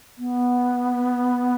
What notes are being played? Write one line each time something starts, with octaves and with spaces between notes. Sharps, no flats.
B3